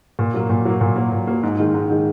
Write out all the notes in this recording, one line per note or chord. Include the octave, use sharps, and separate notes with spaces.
A#2
F#3 A#3
A#2
F#3 A#3
A#2
F#3 A#3
A#2
F#3 A#3
G#2
D#3 G#3
G#2
D#3 G#3